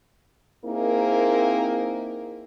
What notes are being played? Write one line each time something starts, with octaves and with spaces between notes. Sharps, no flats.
A#3 C4 D#4 E4 G#4 A#4